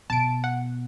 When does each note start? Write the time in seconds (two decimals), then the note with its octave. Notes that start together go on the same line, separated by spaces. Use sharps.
0.10 B2 A5 D7
0.44 F#5